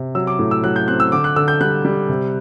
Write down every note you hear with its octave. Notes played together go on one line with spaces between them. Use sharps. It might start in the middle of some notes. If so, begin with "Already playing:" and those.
Already playing: C3
F#3 E6
D6
A2
E6
F#3 F#6
G6
C4 F#6
E6
D3 D6
F#6
D3 E6
G6
G3 F#6
G3
C3